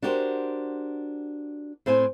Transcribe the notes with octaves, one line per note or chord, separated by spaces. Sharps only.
D4 F#4 G4 A#4 C5
A2 C4 C5 G#5